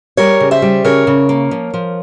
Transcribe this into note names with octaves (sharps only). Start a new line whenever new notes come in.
G3 A#4 C#5
C#3
C5 E5
G3
C#3 A#4 C#5
C#3
A#3
F3
F3